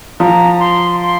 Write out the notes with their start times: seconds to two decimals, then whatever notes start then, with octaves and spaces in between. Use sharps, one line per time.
0.20 F3 A#5
0.60 C6
1.01 C6